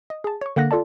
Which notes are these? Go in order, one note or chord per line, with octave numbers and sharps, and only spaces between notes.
D#5
G#4 A5
C#5 C#6
D3 A#3 F#5 F#6 A#6
F4 A4 D5 A5